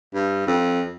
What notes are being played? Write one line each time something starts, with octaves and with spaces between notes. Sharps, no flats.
G2
F2